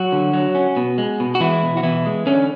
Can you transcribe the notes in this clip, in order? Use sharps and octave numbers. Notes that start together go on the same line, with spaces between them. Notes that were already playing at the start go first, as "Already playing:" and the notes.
Already playing: F#3 F#4
D3
F#3
C#4
B2
G#3
B2
F#4
E3 G#3 E4
B2
F#4
B2 E3 E4
G#3
D3 C#4